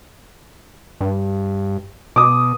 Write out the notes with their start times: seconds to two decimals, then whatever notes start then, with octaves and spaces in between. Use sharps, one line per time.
1.01 G2
2.16 B2 D6 D#6